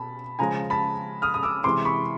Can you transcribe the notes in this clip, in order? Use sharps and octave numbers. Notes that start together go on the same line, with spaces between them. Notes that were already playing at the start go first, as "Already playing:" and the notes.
Already playing: B2 A5 B5
C#3 F3 G#3 G#5 A#5
A5 B5
D#6 F6
D#6
D6 E6
C3 E3 G#3 C6 D6
B5 C#6